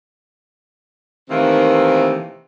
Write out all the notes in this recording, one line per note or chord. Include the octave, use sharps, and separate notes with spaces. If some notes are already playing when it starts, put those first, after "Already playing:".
C3 D#3 E3 A3 A#3 C4